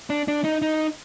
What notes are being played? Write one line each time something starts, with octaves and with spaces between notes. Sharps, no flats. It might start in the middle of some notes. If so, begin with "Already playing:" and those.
D4
D4
D#4
D#4